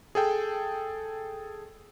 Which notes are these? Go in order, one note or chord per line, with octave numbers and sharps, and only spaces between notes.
G#4 A4 G5